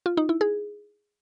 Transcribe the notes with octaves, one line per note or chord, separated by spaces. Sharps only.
F4
D#4
E4
G#4